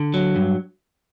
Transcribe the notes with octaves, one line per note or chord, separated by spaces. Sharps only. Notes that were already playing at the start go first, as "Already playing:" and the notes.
Already playing: D3
F#3
G2